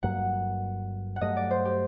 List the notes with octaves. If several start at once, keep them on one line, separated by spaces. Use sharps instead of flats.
G1 G2 F#3 A#3 F#5
F#5
G2 F#3 A3 D#5
D5
C5
G4